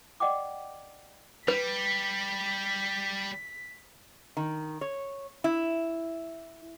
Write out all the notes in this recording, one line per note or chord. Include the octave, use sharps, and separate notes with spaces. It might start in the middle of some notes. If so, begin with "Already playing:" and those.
D5 D#5 F#5 G5 D6
G3 B4 B6
D#3
C#5
E4